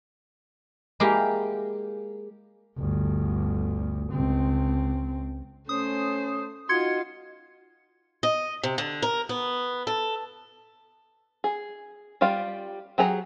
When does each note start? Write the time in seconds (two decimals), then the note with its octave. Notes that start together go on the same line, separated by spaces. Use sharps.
1.00 G#3 A#3 E4 G4 F5 G5
2.78 G1 D2
4.13 C#2 C4
5.69 A3 C#4 C5 D#6
6.69 D#4 F4 F#4 C6 G#6 C#7
8.23 D#5
8.63 C3
8.78 D3
9.02 A#4
9.29 B3
9.87 A4
11.44 G#4
12.21 G3 F4 G4 F5
12.98 F#3 G4 G#4 A#5